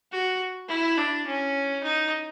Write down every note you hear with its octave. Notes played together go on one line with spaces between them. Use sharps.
F#4
E4
D4
C#4
D#4